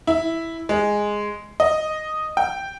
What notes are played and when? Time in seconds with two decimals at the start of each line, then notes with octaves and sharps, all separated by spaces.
0.07 E4
0.69 G#3
1.60 D#5
2.37 G5